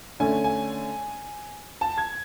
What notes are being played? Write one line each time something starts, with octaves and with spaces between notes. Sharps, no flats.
D3 A3 C#4 G#5
G#5
A5
G#6